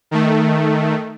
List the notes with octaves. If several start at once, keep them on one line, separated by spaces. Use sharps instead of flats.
D#3 A3